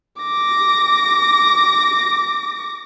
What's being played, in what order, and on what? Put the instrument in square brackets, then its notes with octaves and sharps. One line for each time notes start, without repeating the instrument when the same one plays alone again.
[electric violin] D6 A#6